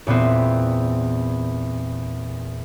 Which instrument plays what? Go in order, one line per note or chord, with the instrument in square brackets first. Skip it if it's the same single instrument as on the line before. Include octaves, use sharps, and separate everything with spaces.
[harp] E2 A#2 B3 C4